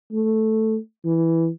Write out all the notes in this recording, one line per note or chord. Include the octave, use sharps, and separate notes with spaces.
A3
E3